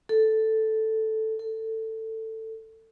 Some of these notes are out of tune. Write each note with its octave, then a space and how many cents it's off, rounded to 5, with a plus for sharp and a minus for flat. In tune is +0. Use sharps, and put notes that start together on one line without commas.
A4 +0
A4 +15